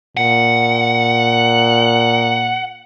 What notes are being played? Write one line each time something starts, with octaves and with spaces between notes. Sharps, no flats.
A#2 F#5